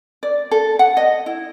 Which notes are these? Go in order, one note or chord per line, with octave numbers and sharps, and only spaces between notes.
D5
A4
F#5
D#5
E4